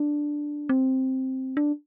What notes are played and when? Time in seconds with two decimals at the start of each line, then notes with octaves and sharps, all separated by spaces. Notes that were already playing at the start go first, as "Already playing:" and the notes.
Already playing: D4
0.69 C4
1.57 D4